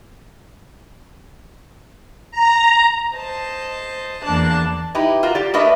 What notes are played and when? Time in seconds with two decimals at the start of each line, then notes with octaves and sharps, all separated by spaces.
2.31 A#5
3.14 C5 D#5 A5
4.23 E2 E3 A#3 D4 A5 F#6
4.95 D#4 E4 G4 B4
5.23 F4 F#4 A#4
5.35 G4 D5
5.54 A3 D4 A#4 B4 D#5 E5